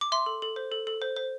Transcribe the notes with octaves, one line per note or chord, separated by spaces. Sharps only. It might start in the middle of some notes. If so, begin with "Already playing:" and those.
D6
E5 C6
A4
A4
C5
A4
A4
C5
C5